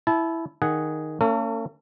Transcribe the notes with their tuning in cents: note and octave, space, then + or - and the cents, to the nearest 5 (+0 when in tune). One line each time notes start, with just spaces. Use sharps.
E4 +0 A5 -35
D#3 +0 G#4 +0 F#5 +0
A#3 -45 C#4 +10 A4 +45